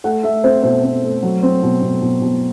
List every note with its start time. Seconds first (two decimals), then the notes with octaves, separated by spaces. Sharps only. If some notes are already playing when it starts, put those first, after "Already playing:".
0.04 A3 F#5
0.23 A3 E5
0.44 C4 C5
0.63 B2 C5
0.83 C4
1.03 A3
1.22 F#3
1.43 C4
1.62 B2
1.82 B2
2.01 B2
2.22 B2